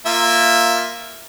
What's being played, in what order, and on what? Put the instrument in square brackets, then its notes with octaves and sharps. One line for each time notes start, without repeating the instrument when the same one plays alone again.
[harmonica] A#3 F4 E5